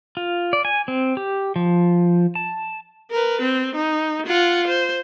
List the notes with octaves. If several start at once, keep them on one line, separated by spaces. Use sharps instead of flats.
F4
D5
G#5
C4
G4
F3
A5
A#4 B4
C4
D#4
F4 F#5
C5